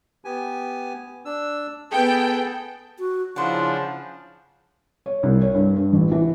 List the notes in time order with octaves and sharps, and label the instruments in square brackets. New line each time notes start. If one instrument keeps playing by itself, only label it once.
[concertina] B3 G4 G#5
D4 E6
[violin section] B3 G5 [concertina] G#4 A4 A5
[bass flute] F#4
[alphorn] C#3 [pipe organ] F3 D4 [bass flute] E4 [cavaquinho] C5 F#5
[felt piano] C#5
C2
C#5
G2
G2
A1
E3